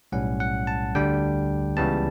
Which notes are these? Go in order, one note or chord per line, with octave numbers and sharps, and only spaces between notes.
B1 A2 G3 C#4 F#5
F#5
A5
D2 D3 G3 D4 G5
C#2 C#3 E3 G3 B3 A5